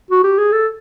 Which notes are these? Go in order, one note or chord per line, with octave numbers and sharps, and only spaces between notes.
F#4
G4
G#4
A4